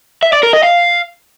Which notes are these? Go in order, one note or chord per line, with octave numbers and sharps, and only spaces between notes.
E5
D5
A#4
D#5
F5